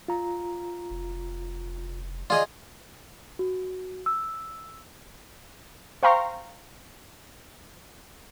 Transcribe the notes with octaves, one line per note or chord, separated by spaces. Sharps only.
F4 A#5
F1
F4 G#4 D5 D#5
F#4
E6
C5 F5 G5 A#5 C6 C#6